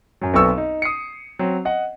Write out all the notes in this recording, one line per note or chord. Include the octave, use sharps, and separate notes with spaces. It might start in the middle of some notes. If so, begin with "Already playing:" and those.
F#2 F#3
B1 B3 C4 A4 C#6 E6
D#4
D#6 C7 C#7
F#3 C4
D#5 F#5